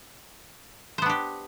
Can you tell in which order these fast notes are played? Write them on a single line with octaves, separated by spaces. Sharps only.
C5 B3 D4 G4